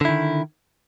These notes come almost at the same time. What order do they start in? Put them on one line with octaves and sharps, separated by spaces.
D3 E4 D#3